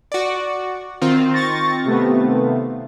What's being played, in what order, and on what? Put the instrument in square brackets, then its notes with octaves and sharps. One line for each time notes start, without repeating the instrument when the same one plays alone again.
[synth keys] F#4 D5
D#3 C4 F4
[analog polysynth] C#6 A6 A#6
C3 A3 B3